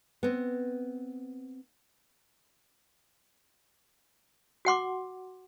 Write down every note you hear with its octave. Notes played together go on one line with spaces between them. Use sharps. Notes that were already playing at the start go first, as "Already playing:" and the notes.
B3 C4
F#4 F#5 C6 D6